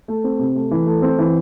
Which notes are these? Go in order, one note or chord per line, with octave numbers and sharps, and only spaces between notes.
A3
C4
C3
A3
E3
A3
C4
E3